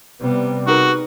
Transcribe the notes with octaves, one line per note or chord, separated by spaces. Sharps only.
C3 G3 B3
D#4 F#4 G#4 A#4 B4